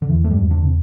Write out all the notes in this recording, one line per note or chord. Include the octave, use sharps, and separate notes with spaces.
D3
E2 E3
A3
G2 G3
E2
D3 D4
C3